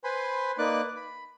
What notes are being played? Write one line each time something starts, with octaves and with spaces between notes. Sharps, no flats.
B4 C5 G#5 B5 C6
A#3 D#4 B4 D5 D6 F#6
B5